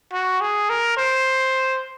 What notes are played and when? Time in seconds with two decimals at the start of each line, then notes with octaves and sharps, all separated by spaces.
0.12 F#4
0.41 G#4
0.70 A#4
0.97 C5